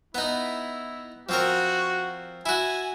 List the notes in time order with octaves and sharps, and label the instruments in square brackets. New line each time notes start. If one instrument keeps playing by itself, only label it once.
[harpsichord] B3 D#4 [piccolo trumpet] E4
[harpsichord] F3 C4 A#4 [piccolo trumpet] F#4
[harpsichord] E4 F#4 [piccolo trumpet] G#5